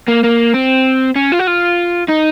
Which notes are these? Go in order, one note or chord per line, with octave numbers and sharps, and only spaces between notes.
A#3
A#3
C4
C#4
F4
F#4
F4
D#4